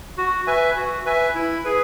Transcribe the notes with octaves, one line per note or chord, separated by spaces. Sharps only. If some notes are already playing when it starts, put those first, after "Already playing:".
F#4
B4 E5 G#5
F#4
B4 E5 G#5
E4
G#4 B4